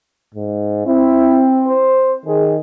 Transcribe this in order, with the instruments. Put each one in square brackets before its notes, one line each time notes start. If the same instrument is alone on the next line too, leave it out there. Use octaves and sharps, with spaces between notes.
[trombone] G#2
[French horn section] C4 [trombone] E4
[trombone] C5
[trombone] D#3 [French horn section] G#4